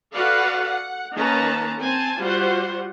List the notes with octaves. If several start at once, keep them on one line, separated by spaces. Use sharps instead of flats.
F#4 A4 B4 D5 F5 F#5
F#5
D#3 A#3 C#4 B4 A5 A#5
C4 G#5 A5
G3 F4 F#4 C5 F#5